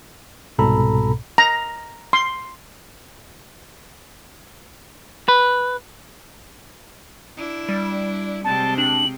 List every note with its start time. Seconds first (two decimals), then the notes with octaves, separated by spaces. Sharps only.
0.58 C2 G#2 B2 A4 A#5 B5
1.38 A#5
2.13 C6
5.28 B4
7.37 D4 E4
7.69 G3
8.44 C3 G#3 C4 A5
8.78 D4 F#7